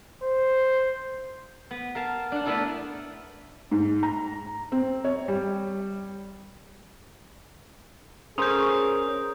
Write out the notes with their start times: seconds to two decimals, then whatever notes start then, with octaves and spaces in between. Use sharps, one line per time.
0.23 C5
1.71 B3
1.95 A#4 F5 A5
2.32 D4 F#5
2.46 A3 B3 D4 E4 A4 A#4
3.71 G#2
4.03 A#5
4.72 C4
5.05 C#5
5.28 G3
8.38 C#4 G#4 A#4 C5 D#6 G6